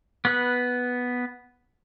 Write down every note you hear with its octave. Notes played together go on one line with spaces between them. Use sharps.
B3 B4 F#6